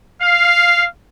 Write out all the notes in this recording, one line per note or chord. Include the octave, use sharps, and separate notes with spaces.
F5